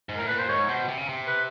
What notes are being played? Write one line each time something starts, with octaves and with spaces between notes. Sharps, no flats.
G#2
A2 A#4
A#2 B4
C5
G#2 C#5
B2 C5
C3
C#3
C3
B4